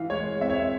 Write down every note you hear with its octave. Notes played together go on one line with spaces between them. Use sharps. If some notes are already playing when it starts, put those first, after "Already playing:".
Already playing: E3 F5
G#3 C#5
C4 E5
C#5
E5